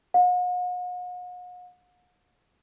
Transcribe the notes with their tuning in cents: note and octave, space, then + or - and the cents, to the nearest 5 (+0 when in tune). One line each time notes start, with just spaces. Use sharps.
F#5 -45